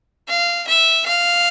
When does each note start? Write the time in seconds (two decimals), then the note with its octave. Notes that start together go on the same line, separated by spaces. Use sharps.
0.29 F5
0.68 E5
1.06 F5